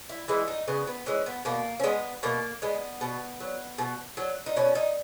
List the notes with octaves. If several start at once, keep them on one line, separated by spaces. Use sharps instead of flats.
E4
E3 G#3 E4
D#4
C#3 B3
B3
E3 G#3 C#4
B3
B2 A#3
C#4
G#3 B3
B2 A#3
G#3 B3
B2
F#3
B2
F#3
D#4
B2 C#4
D#4